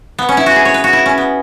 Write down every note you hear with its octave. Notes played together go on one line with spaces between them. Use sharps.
B3
C#4
E4
F#4
G#4
C#5
B4
F#4
E4
C#4
B3